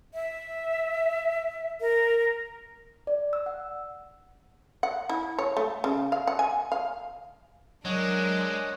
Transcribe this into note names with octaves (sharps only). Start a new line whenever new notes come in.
E5
A#4
D5
E6
F#5
F#5
E4
C#5
A3
C#3
F5
F#5
G#5
F5
F#3 G#3 D4 A#4 C#5 D#5 F#5